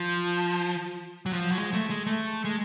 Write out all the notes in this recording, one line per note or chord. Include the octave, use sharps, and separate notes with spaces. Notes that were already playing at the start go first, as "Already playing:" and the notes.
Already playing: F3
F#3
F3
F#3
G#3
A3
G#3
A3
G#3